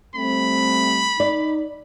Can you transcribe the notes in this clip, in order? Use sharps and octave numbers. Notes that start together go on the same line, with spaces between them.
G3 A3 C4 B5
D#4 D5